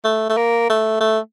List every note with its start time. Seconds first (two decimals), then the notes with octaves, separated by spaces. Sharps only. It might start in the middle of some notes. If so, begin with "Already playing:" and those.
0.04 A3
0.29 A3
0.37 A#3
0.70 A3
1.00 A3